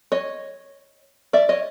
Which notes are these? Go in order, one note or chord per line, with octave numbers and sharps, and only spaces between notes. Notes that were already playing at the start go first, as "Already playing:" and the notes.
C#5 D#5
D5 E5
C#5 D#5